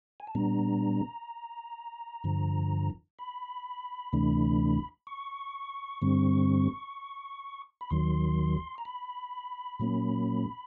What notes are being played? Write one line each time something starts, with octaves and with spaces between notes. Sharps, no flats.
G#5
A5
A#2 G3 B3 D4 A#5
G2 D3 F3
B5
D2 C3 E3 A3 D4
C#6
G2 D3 G3 C4
B5
D#2 D#3 F#3 C6
A#5
B5
A#2 F#3 A#3 C#4